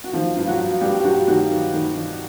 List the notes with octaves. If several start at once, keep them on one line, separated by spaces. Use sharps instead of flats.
F#4
D#3 F3 F4
G2 F4
F#3 F#4
G2
G2 G3 G4
G4
G2 F#3 F#4
D#3 F#3 F#4
D#3
D#3
D#3